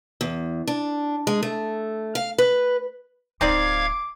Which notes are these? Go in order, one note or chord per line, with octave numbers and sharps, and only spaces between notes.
E2
D4
G#3
A3
F5
B4
D1 C4 D#4 F4 D5 F5 D6 G#6